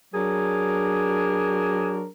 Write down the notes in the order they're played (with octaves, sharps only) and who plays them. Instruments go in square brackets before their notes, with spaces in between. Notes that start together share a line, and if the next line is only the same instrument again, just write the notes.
[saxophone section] F#3 D4 G#4 A#4